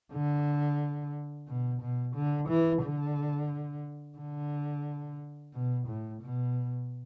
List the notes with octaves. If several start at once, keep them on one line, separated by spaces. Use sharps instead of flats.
D3
B2
B2
D3
E3
D3
D3
B2
A2
B2